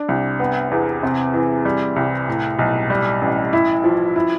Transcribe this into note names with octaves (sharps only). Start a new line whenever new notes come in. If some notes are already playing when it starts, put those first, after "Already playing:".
Already playing: D4
C2
B3
E2
C3
E3
G3
C2
A2
B1
G3
A1
E4
F3
E4